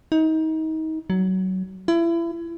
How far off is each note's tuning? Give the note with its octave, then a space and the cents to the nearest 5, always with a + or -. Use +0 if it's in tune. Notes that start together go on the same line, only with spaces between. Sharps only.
D#4 +30
F#3 +20
E4 +30